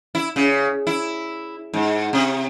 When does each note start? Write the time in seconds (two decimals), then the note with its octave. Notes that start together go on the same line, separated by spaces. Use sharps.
0.15 E4
0.36 C#3
0.87 E4
1.74 G#2
2.13 C3